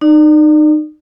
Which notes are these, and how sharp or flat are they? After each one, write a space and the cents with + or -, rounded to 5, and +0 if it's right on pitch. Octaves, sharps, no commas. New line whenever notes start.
D#4 -30 D5 +15